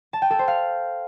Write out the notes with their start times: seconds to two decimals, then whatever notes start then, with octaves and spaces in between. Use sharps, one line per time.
0.13 A5
0.22 G5
0.30 A4
0.39 C5
0.48 F5